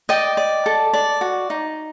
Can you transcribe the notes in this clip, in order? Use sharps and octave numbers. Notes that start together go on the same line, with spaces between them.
D5 D#5 G5
D5
A4
D5
F#4
D#4